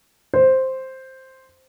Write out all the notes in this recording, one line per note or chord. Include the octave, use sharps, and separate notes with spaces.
C5